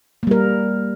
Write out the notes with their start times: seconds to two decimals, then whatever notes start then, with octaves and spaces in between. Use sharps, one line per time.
0.23 A#3
0.27 G3
0.31 A#4